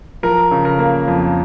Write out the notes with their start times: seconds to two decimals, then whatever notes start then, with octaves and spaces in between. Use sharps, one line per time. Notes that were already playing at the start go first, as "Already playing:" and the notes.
0.23 F3 A#4
0.51 C#3
0.65 A#4
0.79 A#3
1.08 F2